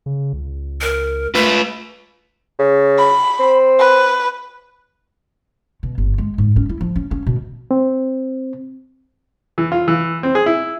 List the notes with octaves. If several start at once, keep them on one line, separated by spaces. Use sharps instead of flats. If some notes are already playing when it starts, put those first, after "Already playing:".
C#3
C#2
A#4
A3 F4 B4
C#3
B5
C4
B4
B2
G1
G#3
G#2
C#4
E4
F3
C#4
C#4
B2
C4
E3
F4
E3
C4
G#4
E4